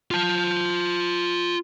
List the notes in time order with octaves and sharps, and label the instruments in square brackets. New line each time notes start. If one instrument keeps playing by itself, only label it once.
[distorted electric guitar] F4 A5